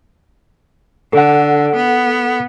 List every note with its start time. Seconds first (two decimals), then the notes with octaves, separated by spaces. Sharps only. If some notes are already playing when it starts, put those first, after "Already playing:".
1.13 D3 A4 F#5
1.76 B3